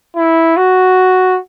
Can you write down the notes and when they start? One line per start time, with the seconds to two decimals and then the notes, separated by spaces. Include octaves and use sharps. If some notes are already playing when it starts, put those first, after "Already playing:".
0.16 E4
0.57 F#4